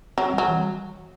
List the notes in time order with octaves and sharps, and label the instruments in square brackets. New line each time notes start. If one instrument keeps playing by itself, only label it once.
[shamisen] F#3 [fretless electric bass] C4
[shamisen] F#3 [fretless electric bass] G3
[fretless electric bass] E3